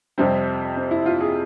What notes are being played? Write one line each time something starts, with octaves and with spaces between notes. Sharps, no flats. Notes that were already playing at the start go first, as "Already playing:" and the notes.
F2 C3 G3 C4
C4
E4
F4
G#4